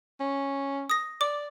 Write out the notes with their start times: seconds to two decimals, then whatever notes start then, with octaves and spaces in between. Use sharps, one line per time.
0.20 C#4
0.90 D#6 A#6
1.21 D5 D6